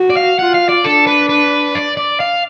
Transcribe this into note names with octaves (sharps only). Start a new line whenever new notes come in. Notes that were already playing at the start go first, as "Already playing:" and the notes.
Already playing: F#4
D5
F5
F4 F#5
F5
D5
D4 A4
B4
B4
D5
D5
F5